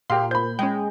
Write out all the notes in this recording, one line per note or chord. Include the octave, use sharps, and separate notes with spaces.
A#2 G4 F5 C6
C5 B5 G6
G#3 C#4 G5